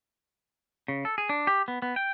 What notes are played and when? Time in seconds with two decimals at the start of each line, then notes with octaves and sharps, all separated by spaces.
0.88 C#3
1.05 A4
1.18 G#4
1.29 D4
1.47 G4
1.68 B3
1.82 B3
1.96 G5